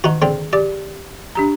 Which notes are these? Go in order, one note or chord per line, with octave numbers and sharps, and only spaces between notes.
D#3 D#4 F#4
D3 C4 G#4
G4 D5
D4 G4 A#5